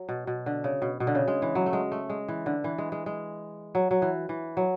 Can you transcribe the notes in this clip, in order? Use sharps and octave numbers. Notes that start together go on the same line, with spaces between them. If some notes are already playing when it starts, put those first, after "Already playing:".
Already playing: F#3
B2
B2
D3
C#3
B2
B2
D3
C#3
G#3
E3
F#3
A3
G#3
A3
G#3
E3
D3
E3
G#3
G#3
G#3
F#3
F#3
E3
E3
F#3